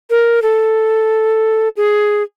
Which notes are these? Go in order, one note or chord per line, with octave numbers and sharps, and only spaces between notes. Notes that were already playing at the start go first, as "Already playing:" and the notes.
A#4
A4
G#4